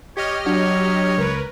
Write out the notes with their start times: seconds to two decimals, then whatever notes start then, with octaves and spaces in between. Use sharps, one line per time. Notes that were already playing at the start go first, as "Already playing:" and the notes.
0.17 G4 C#5 D#5 F6
0.46 F#3 D4 F#4 C#5
1.18 C#2 A#4 B4